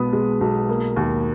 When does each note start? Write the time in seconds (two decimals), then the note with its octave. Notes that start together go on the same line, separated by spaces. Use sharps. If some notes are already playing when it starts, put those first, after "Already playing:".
Already playing: B1 B2 G#3 B3 B5 D#6
0.13 G#3
0.41 B1
0.69 A#3
0.96 D#2